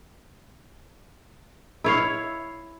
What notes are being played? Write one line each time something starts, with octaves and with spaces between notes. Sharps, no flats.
E4 C#5 F5